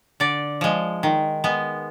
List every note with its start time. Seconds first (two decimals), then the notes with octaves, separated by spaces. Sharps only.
0.20 D3 D5
0.61 F3 G#3
1.03 D#3
1.44 G#3 B3